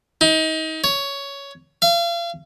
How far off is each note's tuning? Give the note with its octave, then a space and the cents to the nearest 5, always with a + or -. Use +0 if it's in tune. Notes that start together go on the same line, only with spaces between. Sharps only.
D#4 +30
C#5 +10
F5 -35